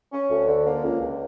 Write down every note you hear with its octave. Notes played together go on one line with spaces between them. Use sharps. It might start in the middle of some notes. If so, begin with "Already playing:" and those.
C#4
D2
D3
A#3
C#2
C#2